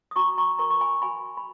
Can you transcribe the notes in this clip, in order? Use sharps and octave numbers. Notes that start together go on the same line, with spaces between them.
D#6
F#4 A#5 C#6
A#5 C#6
A#4 A#5 C#6
C#6
G#5 B5
F#4 G#5 B5
B5